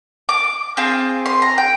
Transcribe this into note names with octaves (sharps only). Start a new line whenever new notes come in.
D6
C4 F4 G#4
C6
A#5
G5